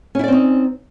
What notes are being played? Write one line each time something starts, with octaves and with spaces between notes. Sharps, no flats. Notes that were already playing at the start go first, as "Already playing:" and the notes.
C4 C#4 D#4 E4 D5